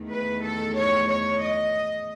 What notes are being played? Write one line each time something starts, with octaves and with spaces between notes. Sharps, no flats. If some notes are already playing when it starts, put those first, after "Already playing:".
Already playing: E2 D#3 A3
B4
A4
C#5
C#5
D#5